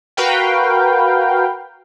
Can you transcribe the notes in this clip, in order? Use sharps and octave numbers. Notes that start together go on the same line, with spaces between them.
F#4 A#4 B4 F5 G5